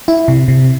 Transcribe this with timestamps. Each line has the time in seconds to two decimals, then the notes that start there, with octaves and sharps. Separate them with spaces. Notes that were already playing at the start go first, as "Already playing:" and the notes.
0.08 E4
0.28 C3
0.48 C3